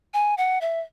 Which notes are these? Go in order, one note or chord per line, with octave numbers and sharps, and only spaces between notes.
G#5
F#5
E5